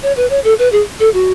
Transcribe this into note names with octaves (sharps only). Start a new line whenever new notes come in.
C#5
B4
C#5
A4
B4
G#4
A4
F#4